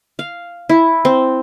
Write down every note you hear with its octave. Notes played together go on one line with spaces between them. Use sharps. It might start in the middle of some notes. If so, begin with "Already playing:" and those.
F5
E4
C4